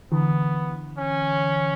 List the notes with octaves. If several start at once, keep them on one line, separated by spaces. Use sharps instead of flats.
D3 E3 B3
C#4